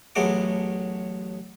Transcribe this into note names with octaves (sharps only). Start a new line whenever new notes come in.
A1 F#3 A3 B3 G#4 D6